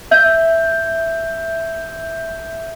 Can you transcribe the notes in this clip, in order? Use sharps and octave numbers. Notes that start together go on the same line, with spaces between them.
E5 G6